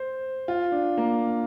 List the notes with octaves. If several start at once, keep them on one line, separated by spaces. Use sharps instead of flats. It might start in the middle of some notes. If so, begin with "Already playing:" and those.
Already playing: C5
F4
D4
A#3